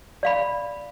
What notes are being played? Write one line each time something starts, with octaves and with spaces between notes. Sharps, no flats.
D5 F5 B5